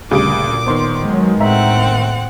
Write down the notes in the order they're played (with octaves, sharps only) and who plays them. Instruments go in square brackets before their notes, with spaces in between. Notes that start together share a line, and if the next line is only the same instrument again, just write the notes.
[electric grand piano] D2 D#6 D7 [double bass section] A#2 [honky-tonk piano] C#3 G3 [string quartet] D6
[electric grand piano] D#3 B3 [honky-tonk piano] C5 C6
[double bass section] F#3 G#3
[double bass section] A2 [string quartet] C4 F#5 [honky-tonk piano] E5 A#5